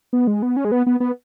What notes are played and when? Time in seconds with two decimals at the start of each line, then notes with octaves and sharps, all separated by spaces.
0.13 B3
0.27 G#3
0.42 B3
0.57 C#4
0.65 G#3
0.72 B3
0.87 B3
1.00 B3